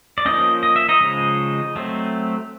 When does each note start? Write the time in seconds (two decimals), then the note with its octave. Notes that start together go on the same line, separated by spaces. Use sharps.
0.18 D5
0.25 F3 A#3 C#4 D#4 D#5
0.63 D#5
0.76 E5
0.89 D#4 D#5
1.00 C#3 F3 G#3
1.76 F#3 A3 C4